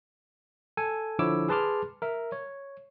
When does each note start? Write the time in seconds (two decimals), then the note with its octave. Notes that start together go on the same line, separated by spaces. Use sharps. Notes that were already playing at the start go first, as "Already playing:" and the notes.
0.77 A4 G#5
1.19 D3 F3 E4 C#5 D6 E6
1.49 G#4 B4 A5 C6 D6 F6
2.02 A#4 E5
2.32 C#5